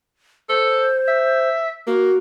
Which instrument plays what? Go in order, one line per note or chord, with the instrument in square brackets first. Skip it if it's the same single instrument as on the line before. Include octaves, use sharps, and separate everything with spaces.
[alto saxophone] A4 [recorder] C5
[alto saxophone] E5
[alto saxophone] A#3 [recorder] F#4